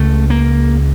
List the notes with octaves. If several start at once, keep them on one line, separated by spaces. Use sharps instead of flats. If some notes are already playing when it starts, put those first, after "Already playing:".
Already playing: C#2 C#3 A3
A#3